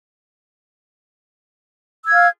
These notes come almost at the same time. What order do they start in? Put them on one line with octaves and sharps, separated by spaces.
E6 G#6 F5 F6